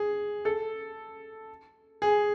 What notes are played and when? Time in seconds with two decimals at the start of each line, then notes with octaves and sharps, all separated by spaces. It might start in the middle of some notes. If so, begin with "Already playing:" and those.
Already playing: G#4
0.45 A4
2.02 G#4